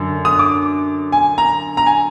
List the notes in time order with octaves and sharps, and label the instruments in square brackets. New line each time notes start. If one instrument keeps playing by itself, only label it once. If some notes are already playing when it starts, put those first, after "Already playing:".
Already playing: [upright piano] F#2 D3
D#6
D6
G#5
A#5
A#5
G#5